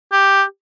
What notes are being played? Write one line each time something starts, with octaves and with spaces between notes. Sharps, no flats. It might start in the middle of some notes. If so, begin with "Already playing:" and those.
G4